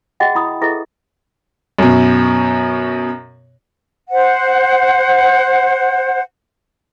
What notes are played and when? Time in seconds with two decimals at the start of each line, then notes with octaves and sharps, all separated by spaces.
0.20 F#4 G#4 D#5 E5 F#5 G5
0.35 E4 B5 D#6
0.62 E4 G#4 A4 B4 D#5 E5
1.79 F#2 B2
4.09 C5 F#5